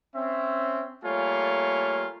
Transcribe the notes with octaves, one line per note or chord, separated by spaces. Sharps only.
C4 C#4 E5
G3 A3 A#3 F4 C#5 G#5